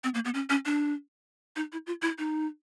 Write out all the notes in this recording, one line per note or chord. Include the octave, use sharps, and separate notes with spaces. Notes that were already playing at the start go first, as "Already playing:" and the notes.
C4
A#3
B3
C#4
C#4
D4
D#4
E4
F4
E4
D#4